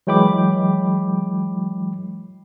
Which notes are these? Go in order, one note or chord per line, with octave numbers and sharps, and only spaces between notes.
E3 F#3 G#3 G5 B5 D6